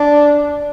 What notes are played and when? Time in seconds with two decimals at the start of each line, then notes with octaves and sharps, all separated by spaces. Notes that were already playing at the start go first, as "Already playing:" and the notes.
Already playing: D4